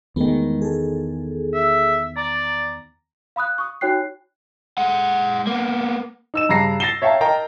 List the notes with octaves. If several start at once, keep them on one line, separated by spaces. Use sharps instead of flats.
E2 D#3 G#3 A3 B3
G#4 A4
E5
D5 A#5
F5 B5 D#6 F#6
C#6 D#6
D#4 F#4 C#5 G5 F#6 C7
G#3 F#5
A#3 B3
D#4 E6 E7
G2 C#3 A#5 A#6 C7
A6 A#6 C7 E7 G7
C#5 E5 F5 G5 A5 A#5
A#4 D#5 G5 A5 A#5